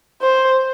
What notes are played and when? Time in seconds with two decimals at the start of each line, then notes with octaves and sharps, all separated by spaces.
0.21 C5